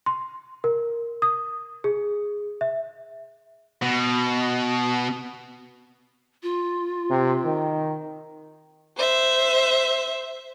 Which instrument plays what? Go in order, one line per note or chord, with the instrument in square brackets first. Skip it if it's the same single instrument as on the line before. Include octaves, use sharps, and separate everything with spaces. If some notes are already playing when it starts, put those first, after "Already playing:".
[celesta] C6
A#4
D#6
G#4
E5
[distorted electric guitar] B2
[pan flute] F4
[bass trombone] C3
D#3
[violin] C5 E5